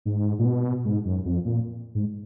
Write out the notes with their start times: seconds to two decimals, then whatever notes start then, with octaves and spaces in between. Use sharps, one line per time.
0.06 G#2
0.39 A#2
0.45 B2
0.85 G#2
1.05 F#2
1.25 F2
1.45 A#2
1.95 G#2